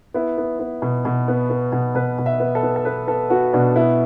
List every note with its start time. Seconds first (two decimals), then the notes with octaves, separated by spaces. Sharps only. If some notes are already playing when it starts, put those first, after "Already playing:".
0.14 B3 E4
0.38 B3
0.59 B3
0.82 B2
1.05 B2
1.28 B3
1.50 B3
1.72 B2
1.95 B2 B4
2.18 B2
2.26 E5
2.40 B3
2.55 A4
2.63 B3
2.76 A4
2.85 B3 B4
3.08 B3 A4
3.30 B3 F#4
3.53 B2 D4
3.76 B3 E4